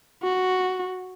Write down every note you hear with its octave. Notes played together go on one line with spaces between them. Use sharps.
F#4